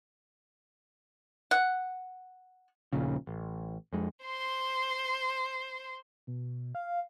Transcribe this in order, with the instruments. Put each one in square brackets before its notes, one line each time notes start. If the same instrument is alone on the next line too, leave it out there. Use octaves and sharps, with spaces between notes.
[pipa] F#5
[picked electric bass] D#1 A#1 A#2 C#3
A1
F2 G#3
[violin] C5 C6
[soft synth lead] B2
F5